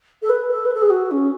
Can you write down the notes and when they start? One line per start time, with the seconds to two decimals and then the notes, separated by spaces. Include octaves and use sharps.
0.22 A4
0.29 B4
0.50 A4
0.65 B4
0.73 A4
0.81 G#4
0.89 F#4
1.10 C#4